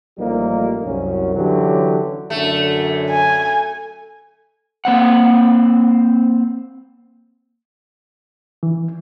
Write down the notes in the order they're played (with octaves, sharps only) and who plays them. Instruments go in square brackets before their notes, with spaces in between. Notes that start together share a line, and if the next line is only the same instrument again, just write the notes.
[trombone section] A1 F3 G3 A3 A#3 D#4
C2 F#2 C#4
D3 E3 F#3 C#4 G4
[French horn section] F#2 D3 [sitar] A3
[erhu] G#5
[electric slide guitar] A#3 C4 F#5
[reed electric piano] E3